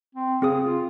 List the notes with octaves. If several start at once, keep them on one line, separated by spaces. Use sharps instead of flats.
C4
C#3 C4 G#4 D#6
F4